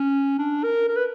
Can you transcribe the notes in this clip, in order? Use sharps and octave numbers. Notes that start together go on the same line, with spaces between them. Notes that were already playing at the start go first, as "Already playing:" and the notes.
Already playing: C#4
D4
A#4
A#4
B4